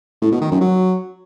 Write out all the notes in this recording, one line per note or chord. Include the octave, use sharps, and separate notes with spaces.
A2
B2
D#3
F#2
F#3